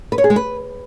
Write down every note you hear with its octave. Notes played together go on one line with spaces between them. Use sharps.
B4
C#5
G#4
G#3
B4